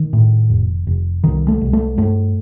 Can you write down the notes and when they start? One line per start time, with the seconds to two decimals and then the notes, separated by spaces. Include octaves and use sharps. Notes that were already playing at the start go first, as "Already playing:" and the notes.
Already playing: D#3
0.13 A2
0.50 F1
0.87 F1
1.24 C2 D#3
1.48 A3
1.61 C2
1.73 A3
1.97 G2 A3